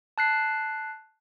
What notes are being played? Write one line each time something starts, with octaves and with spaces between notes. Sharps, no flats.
A5 F#6 C7